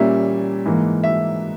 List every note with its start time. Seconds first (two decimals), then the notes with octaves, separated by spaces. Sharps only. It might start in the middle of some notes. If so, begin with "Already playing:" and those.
Already playing: A#2 G3 A#3 C#4 E5
0.66 G#2 E3 A#3
1.04 E5